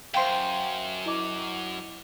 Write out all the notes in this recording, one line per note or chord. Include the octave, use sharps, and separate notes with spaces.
F#2 C5 F5 G5 C6
E4 D#5 D6